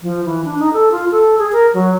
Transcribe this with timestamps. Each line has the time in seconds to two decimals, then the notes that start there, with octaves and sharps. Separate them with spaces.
0.02 F3
0.26 E3
0.44 D4
0.59 D#4
0.73 A4
0.92 F4
1.11 A4
1.38 G#4
1.52 A#4
1.74 F#3